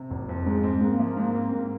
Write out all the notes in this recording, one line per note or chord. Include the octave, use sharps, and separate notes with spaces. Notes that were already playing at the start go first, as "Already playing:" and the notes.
Already playing: C3
F#1
F2
G#2 G#3
C4
G#2 A#3
F3
G#2
C4
G#2